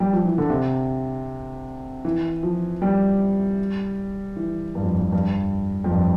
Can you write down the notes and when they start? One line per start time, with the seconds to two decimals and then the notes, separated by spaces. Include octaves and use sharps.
0.00 G3
0.13 F3
0.25 E3
0.38 D3
0.50 C3
2.05 E3
2.43 F3
2.82 G3
4.37 E3
4.75 G2
4.83 F2
4.99 F2
5.13 G2
5.84 F2
5.91 G2